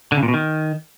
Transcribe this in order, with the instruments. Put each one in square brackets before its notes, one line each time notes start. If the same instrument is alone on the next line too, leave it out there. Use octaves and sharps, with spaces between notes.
[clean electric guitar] D3
C#3
A#2
B2
D#3